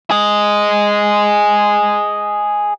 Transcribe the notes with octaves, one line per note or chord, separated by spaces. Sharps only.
G#4 D#5